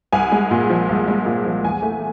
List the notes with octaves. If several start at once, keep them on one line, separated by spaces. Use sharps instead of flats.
C2 G#5
G#3
A#2
F3
C2
G#3
A#2
F3
E2 G#5
A3